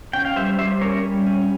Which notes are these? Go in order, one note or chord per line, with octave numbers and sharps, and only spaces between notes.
C#4 G5
F5
G3 C5 E5
G3 C5 E5
C#4 A#4 C#5
G3
C#4